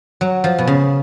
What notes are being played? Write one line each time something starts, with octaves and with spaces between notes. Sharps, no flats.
F#3
F3
B2
C#3